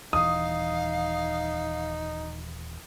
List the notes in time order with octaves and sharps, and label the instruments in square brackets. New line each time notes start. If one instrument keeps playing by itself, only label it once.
[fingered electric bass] D#1 E3 [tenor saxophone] D#4 [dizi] F5 [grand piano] D#6